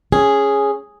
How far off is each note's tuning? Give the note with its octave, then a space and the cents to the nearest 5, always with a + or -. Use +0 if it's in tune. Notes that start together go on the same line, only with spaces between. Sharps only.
C#4 +0 G#4 +0